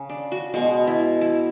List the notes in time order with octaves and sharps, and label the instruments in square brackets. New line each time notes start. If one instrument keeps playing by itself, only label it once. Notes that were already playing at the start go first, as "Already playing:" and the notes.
Already playing: [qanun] C#3
D4
F#4
B2 G#3 B3 F#4
E4
E4